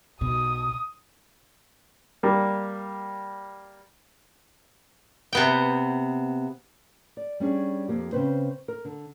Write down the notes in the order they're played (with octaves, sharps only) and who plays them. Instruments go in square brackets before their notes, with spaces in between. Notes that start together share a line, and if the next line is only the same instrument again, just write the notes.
[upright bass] B1 B2 [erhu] D#6
[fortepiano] G3 A#3
[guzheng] C3 B3 G5
[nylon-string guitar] D5
G3 C#4 D4 G#4
F2 A#3 G4
C#3 C4 B4 C5
A#4
D3